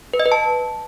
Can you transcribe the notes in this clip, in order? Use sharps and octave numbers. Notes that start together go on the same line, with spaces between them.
B4
D#5
B4
A5